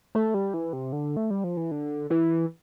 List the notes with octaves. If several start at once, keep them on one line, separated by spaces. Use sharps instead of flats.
A3
G3
E3
C3
D3
A3
G3
F3
E3
D3
E3